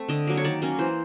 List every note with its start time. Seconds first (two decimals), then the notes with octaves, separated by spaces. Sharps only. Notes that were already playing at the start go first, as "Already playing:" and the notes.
Already playing: A3 C4
0.08 D3 D#5
0.27 F#3 A#3
0.37 C#5
0.44 D#3 D5
0.62 F#3 A#3 C#4
0.79 E3 C5